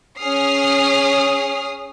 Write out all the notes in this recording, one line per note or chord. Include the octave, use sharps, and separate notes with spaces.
C#4 G#4 D#6 F6 C7